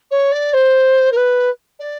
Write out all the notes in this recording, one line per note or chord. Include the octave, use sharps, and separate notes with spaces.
C#5
D5
C5
A#4
B4
D5